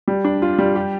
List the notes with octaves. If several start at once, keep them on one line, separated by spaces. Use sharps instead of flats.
G3
D4
F4
G3
G4